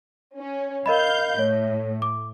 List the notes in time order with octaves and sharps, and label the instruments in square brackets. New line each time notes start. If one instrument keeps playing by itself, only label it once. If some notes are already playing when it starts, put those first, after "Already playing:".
[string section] C#4
[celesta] A#4 D#5 B5 [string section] F5 G6
[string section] A2 [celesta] C#5
[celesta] D6